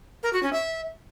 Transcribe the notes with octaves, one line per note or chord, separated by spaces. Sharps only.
A#4
F#4
C#4
E5